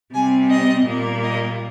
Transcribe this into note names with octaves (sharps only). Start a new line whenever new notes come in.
C3 G3 C4 G#5
D#5
A#2 G3 A#3
D#5